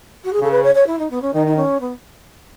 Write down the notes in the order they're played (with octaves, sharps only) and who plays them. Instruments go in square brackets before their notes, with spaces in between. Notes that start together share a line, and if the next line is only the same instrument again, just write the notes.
[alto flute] F#4
G#4
[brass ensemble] C#3 [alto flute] A4
[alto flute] B4
C#5
C#5
E4
D#4
B3
C#4
[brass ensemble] D#3 [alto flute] D#4
[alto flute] D#4
C#4
B3